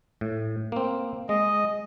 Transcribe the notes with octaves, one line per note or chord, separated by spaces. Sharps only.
A2
A#3 C4
G#3 D#5